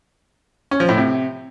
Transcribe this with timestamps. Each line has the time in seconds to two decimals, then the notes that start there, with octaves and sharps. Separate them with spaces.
0.71 C#4
0.80 F3
0.89 A2
0.97 C3